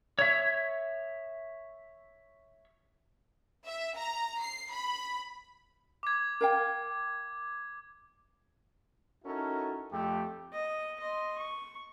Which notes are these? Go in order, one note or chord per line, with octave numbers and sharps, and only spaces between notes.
C#5 E5
E5
A#5
C7
B5
D6 G#6
A#4 F5 G5
C#4 D#4 E4 F#4 A4 A#4
F2 A3 G4
D#5
D#5 C6
C#6